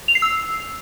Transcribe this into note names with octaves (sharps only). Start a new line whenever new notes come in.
F7
C7
E6